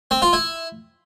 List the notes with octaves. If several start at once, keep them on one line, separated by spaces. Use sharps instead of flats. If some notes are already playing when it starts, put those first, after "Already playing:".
C4
F4
E4